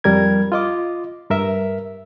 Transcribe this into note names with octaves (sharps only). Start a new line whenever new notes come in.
F2 G3 A#4 G#6
F4 D#5 D6
G2 A#4 E5